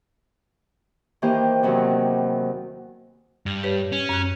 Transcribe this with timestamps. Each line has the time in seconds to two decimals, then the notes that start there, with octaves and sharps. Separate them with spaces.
1.22 D#3 E3 A#3 G4 C5
1.63 E2 C3 D#3 F#3
3.46 G2
3.63 G4 B4 C#5
3.92 C#4
4.09 F#2 F#6